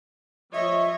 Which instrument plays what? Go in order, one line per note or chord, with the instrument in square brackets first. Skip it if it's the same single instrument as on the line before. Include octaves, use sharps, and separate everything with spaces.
[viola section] F3 C#5 D#5 [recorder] E5